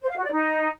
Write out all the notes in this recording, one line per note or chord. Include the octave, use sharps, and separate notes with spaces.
C5
F5
F#4
D5
D#4